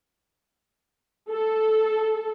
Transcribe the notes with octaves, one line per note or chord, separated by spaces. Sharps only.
A4